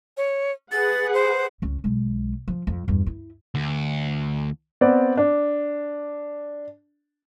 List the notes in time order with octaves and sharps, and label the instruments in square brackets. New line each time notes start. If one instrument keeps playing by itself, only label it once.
[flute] C#5
[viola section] G#4 B4 F#5 [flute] A6
[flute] C5
[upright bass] C#2 C#4
B1 G#3
F3
F2
E2 G2
E4
[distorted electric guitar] D2
[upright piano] B3 C4 D5
D4